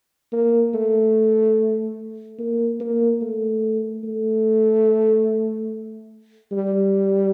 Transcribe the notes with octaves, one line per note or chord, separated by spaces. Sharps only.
A#3
A3
A#3
A#3
A3
A3
G3